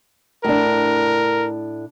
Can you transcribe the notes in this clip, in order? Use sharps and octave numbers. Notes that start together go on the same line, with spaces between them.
A2 D4 A#4